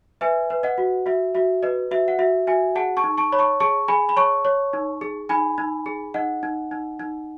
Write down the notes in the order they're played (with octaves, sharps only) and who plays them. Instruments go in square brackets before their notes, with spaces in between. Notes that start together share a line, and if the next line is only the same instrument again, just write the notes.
[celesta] B4 E5 G#5
B4
D#5 F#5
F#4
F#4 E5
F#4 E5
B4 D#5
F#4 E5
F#5
F#4 E5
F#4 E5 G#5
G#4 F#5 A5
A5 C#6
D#4
A5 C#6
C#5 B5
A5 C#6
G#4 A5 C#6
G#4 G#5 B5
B5
C#5 A5 C#6
C#5
D#4
G#4
D#4 G#5 B5
D#4
G#4
D#4 D#5 F#5
D#4
D#4
D#4